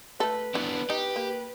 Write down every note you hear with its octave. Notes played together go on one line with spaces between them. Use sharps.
A3 A4 B4
E3 B3 D4
D#4 G4
A#3